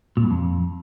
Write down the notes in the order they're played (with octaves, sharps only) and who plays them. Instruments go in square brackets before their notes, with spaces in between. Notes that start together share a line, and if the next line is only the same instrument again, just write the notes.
[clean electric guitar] A#2
G2
F2